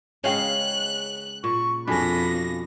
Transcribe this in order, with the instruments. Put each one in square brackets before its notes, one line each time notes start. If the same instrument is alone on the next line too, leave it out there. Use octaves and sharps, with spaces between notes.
[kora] C#3 G#3 C#4 [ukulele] C#5 F5 G5 [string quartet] F#6
[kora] A#2 [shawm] C#6
[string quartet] F2 A#6 [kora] B2 [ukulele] D4 G#4 A4 [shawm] B5